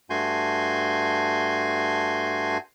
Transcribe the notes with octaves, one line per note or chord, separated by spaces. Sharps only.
G2 A3 F#4 G#5 C6 G6